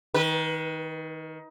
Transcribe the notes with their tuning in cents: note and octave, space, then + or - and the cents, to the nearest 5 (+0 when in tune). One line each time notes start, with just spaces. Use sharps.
D#3 +20 B4 -20